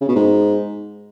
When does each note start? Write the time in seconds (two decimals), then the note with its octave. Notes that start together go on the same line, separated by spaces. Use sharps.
0.01 C#3
0.08 B2
0.15 G#2